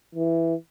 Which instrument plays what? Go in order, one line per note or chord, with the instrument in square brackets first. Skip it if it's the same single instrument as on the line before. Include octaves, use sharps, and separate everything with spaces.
[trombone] E3